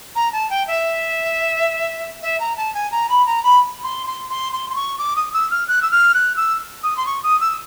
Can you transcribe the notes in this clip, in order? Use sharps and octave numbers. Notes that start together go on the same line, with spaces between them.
A#5
A5
G5
E5
E5
A#5
A5
G#5
A#5
B5
A#5
B5
C6
C6
C6
C6
C6
C#6
D6
D#6
E6
F6
F#6
E6
F6
F#6
E6
D#6
C6
C#6
D#6
E6